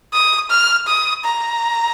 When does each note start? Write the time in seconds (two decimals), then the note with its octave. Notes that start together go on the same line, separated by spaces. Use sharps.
0.13 D#6
0.50 F6
0.87 D#6
1.25 A#5